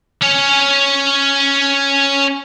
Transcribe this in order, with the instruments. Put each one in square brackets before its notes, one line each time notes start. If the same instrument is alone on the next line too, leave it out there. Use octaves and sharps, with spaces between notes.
[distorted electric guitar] C#4 C#5